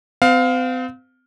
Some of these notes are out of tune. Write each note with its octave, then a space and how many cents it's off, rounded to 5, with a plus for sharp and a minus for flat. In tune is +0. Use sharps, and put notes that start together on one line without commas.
C4 -40 F5 +15